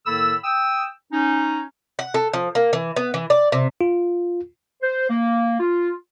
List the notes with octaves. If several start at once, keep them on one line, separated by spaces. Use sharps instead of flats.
A2 D#3 A#3 A4 B5 E6
G5 D#6 E6
C#4 D#4
F#5
A4
F3
A#3
E3
B3
E3
D5
C3
F4
C5
A#3
F4